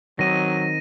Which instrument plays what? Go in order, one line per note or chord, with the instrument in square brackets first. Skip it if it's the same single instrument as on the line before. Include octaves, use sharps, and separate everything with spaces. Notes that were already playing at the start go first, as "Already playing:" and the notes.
[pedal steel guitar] D#3 C4 D#5 [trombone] F#3 [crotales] A#6 D#7